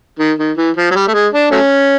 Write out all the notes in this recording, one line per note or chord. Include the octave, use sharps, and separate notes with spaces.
D#3
D#3
E3
F3
F#3
G3
A3
G#3
D4
F#3 A3 C#4